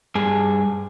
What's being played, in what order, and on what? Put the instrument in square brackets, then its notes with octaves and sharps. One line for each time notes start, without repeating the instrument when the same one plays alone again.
[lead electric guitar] G2 G#4